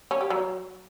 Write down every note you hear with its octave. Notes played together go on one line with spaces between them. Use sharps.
C#4
G4
F#3